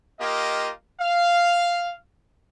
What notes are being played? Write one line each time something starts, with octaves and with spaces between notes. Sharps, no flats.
A#3 F4 G4 D#5
F5